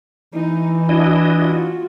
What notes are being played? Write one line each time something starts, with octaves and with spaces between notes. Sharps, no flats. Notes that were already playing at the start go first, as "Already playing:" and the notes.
E3 D#4 E4
D4 E4 F#4 D#5
F4 F#4